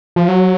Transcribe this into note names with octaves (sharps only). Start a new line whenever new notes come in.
F3
F#3